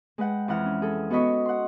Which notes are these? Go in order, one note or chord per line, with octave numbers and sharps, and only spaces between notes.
G#3 B4 F#5 G5
F2 E3 F#5 F6
C#4
G#4 A4
B3 F#4 B4 D#5 B5 C#6
F#5 C6